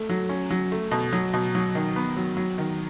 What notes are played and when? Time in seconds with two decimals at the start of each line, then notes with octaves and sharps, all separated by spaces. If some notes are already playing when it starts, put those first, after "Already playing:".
Already playing: A3
0.09 F#3
0.29 C#4
0.50 F#3
0.72 A3
0.92 B2
1.13 F#3
1.34 B2
1.55 F#3
1.75 D#3
1.96 B3
2.17 F#3
2.37 F#3
2.58 D#3